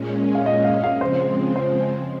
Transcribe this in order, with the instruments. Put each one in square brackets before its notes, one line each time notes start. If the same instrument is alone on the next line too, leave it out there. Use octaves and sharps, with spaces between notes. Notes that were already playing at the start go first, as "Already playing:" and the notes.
Already playing: [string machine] A#2 G#3 C#4
[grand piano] F5
D#5
F5
F5
[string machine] C#3 F3 G#3 C4 [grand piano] C5
[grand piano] C5